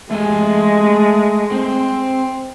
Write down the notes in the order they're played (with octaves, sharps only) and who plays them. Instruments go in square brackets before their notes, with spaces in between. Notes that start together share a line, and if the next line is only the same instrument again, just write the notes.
[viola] G#3 [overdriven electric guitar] A3 G#5
[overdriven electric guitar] C4